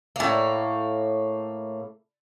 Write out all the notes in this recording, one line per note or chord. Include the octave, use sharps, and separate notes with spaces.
A2 A#3